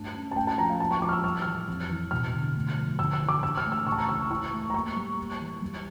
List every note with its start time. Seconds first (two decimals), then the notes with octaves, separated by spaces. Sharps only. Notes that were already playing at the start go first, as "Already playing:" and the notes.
Already playing: G2 A3 A5
0.14 C#4
0.31 A5
0.36 A3 G5
0.47 A5
0.58 F3 A#5
0.69 F5
0.80 A#3 A5
0.91 C#6
1.02 F3 D6
1.09 F6
1.13 E6
1.24 G3 F6
1.42 E3 F6
1.68 F2
1.90 E3
2.11 E1 F6
2.33 D3
2.55 A3
2.77 F3
2.99 G1 E6
3.13 E6
3.21 E3
3.29 D6
3.42 G2 E6
3.57 F6
3.65 A3
3.72 E6
3.87 C#2 C#6
3.92 A5
3.97 A#5
4.08 E3 E6
4.30 E4 C#6
4.52 A3
4.70 A#5
4.74 A#3 C#6
4.96 G3
5.18 A#3
5.40 E3
5.62 G3